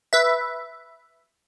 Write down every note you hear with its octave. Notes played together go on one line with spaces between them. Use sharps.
B4 E5